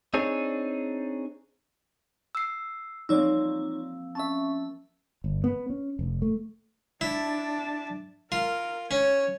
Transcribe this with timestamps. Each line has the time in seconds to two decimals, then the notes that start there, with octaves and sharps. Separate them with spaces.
0.14 C4 D4 D#4 G#4 C#5
2.35 E6 C7
3.09 F3 A#3 C4 D#4 C#5 D5 E6
4.15 C#4 E5 A5 C#6
5.24 G1
5.44 B3
5.70 C#4
5.99 F1
6.22 A3
7.01 D4 E4 A5
8.32 F4 A#4
8.91 C#4 C#5